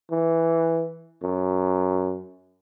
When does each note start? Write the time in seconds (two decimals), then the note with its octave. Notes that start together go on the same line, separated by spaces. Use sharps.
0.11 E3
1.23 F#2